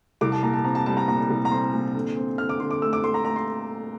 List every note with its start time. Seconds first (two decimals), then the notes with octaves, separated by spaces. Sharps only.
0.21 C2 D6
0.32 A5
0.43 A#2 A#5
0.54 A5
0.64 C4 A#5
0.75 A5
0.86 G3 A5
0.97 A#5
1.08 A#2 A#5
1.30 C2
1.45 A#5
1.51 C4 C6
1.73 A#2
1.95 D3
2.17 C4
2.38 D3 F6
2.49 D6
2.60 D3 C6
2.71 D6
2.82 A3 E6
2.93 D6
3.03 A3 C6
3.14 A#5
3.25 A3 A#5
3.36 C6